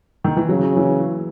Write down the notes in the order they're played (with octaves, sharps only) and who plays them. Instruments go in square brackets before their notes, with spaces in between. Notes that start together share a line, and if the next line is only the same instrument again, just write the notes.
[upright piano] D#3
E3
[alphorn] C#3 [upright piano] F#3
[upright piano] E3